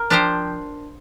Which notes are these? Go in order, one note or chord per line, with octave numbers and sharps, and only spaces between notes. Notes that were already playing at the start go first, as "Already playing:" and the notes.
Already playing: A#4
F3 D4 G4 C5